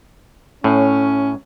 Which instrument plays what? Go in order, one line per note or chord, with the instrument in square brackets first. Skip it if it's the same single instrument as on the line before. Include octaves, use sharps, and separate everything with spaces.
[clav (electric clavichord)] A2 [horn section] C#4